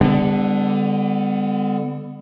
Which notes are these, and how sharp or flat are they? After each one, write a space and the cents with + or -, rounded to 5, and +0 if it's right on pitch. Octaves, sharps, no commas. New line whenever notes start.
D3 +0 G3 +45 B3 +30